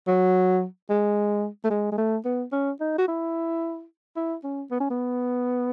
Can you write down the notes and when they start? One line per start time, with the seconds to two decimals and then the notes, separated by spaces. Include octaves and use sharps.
0.08 F#3
0.90 G#3
1.64 A3
1.70 G#3
1.92 G#3
1.98 A3
2.25 B3
2.52 C#4
2.81 D#4
2.98 F#4
3.08 E4
4.16 E4
4.44 C#4
4.71 B3
4.80 C#4
4.90 B3